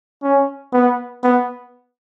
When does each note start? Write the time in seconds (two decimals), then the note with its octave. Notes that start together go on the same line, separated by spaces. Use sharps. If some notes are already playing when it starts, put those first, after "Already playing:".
0.23 C#4
0.73 B3
1.24 B3